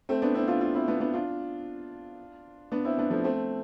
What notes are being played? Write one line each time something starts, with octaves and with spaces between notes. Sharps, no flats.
A3 C4
B3 D4
C4 E4
D4 F4
D4 F4
C4 E4
B3 D4
B3 D4
D4 F4
B3 D4
C4 E4
B3 D4
F3 A3
A3 C4